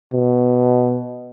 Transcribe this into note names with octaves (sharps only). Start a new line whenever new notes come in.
B2